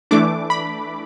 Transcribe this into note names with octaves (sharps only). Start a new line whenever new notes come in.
E3 A3 D4 D6
B5